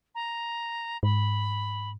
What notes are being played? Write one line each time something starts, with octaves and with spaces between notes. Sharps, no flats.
A#5
G#2 B5